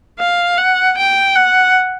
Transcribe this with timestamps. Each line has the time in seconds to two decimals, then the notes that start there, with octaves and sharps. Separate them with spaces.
0.19 F5
0.58 F#5
0.98 G5
1.36 F#5